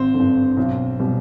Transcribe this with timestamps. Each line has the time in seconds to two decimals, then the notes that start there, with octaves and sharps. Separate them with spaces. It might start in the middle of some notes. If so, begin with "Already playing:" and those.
Already playing: G#1 C4 C5
0.14 D3
0.20 G2
0.57 B1
1.00 B2 G3